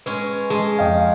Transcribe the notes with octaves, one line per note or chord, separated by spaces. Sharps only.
G#3 C#4 B4
G#3 G#4 A5
F2 D#5 F5 G5